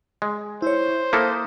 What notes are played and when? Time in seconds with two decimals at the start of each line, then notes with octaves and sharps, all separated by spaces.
0.22 G#3
0.62 E4 C5 C#5
1.13 A#3 E4 A4 D#6